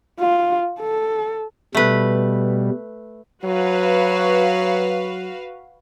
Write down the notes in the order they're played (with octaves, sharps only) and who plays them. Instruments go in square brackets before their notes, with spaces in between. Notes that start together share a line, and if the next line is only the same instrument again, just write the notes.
[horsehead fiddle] F4
A4
[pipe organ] B2 G3 [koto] A3 B4
[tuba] F#3 [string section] F#4 B4 F5